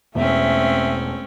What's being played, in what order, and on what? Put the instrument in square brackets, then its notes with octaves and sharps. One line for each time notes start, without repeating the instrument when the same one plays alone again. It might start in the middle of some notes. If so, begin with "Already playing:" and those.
[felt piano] E1 [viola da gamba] A3 C4 C#4 [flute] E5